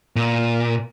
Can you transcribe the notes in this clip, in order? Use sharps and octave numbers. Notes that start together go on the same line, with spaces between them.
A#2